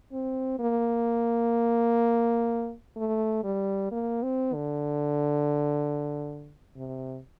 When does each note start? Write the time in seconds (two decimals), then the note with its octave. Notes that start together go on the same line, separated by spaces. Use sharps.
0.12 C4
0.59 A#3
2.96 A3
3.44 G3
3.91 A#3
4.23 C4
4.54 D3
6.76 C3